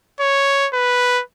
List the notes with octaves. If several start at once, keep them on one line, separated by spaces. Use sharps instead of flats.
C#5
B4